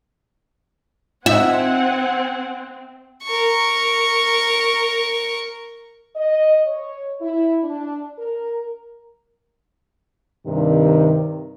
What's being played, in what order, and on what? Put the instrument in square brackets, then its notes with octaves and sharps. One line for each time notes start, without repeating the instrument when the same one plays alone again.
[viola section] C4 [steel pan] D#4 F4 [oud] E5 [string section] F#5 G#5
[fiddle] A#4 C#6
[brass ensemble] D#5
C#5
E4
D4
A#4
[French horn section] G2 C3 D#3